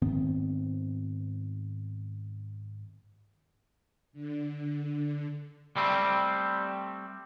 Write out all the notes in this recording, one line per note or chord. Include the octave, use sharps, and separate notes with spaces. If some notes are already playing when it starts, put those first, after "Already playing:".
G#2 D#3 B3 C4
D3
G3 A3 C4